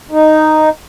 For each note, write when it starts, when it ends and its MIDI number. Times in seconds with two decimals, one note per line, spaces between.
0.11 0.69 63